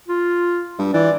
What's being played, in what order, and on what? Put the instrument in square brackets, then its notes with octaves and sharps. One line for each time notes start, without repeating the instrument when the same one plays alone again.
[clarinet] F4
[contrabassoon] G2
[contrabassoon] E3 [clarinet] D5